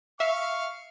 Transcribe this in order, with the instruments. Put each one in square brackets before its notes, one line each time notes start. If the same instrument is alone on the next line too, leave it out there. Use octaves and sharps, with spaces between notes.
[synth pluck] E5 [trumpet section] F5 C#6